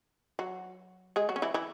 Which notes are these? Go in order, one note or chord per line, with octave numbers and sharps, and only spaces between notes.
F#3 F#4
G#3 G#4
F#3 F#4
C#4
E3 E4
E3 E4